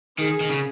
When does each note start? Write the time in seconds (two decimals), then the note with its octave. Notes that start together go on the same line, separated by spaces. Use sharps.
0.18 D#3 G#4
0.40 D#3
0.50 C#3